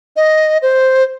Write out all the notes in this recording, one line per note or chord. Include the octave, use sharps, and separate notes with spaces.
D#5
C5